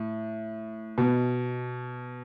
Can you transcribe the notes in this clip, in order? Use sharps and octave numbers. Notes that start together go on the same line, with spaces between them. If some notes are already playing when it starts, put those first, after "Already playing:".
Already playing: A2
B2